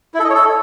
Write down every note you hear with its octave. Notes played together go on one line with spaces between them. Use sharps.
E4
A4
D#5
C#5
A4